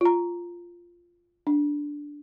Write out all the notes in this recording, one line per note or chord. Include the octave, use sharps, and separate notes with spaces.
F4 A#5
D4